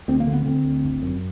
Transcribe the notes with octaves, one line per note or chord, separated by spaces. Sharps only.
D2 C4
A#3
D3
B3
D3 C4
D2
G1
F#2